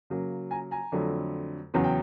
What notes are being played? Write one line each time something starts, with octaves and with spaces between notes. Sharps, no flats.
C#3 F#3 A#3
G#5 A#5
G#5 A#5
F2 D3 F#3 A3
E2 C#3 F#3 B3
G5